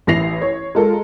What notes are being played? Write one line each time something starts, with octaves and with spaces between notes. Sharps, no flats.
A1 E3 E4 A#6 C7 F7
C#5
G#3 F4 A4 A#4